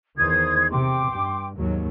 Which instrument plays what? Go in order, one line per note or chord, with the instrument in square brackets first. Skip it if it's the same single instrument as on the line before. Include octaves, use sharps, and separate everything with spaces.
[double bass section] E2 D#3 [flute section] C5 D#6 G#6
[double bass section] C3 [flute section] G5 C6 D6
[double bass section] G2
D#2 G#2 F#3